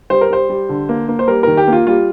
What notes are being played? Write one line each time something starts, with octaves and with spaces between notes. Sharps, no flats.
G3 C5
A#4
G3 C5
G3
D3
A#3
A#3
C5
G3 A#4
D#3 A#4
G4
A#3 F4
G3 F4